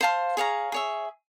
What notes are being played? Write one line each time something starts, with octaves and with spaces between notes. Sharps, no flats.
C5 F5 A5 C6
G#4 C#5 F5 A#5
G#4 C#5 E5